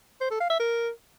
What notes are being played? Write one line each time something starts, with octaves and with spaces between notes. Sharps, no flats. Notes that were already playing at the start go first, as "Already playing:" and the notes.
C5
A4
F5
E5
A#4